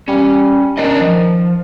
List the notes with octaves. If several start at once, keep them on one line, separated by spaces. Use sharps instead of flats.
G3 C#4
D#3 C#4 D4 D#5
F3